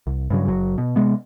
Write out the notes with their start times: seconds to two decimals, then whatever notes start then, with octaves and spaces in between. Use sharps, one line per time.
0.07 C2
0.30 G2 C#3 F#3
0.48 F#1 F#3
0.78 B2
0.96 C3 G#3 B3